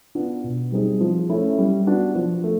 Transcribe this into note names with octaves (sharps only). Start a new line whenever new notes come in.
B3 D4 F4
B2
G3 C4 D#4 G#4
F3
A3 C#4 E4
G3
B3 D4 F#4
F3
A3